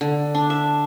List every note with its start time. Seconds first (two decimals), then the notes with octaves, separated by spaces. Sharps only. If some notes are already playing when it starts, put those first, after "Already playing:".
0.01 D3
0.35 D4
0.50 E5